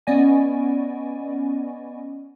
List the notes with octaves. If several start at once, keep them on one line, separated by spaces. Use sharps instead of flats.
B3 C#4 D5 D#5 G#5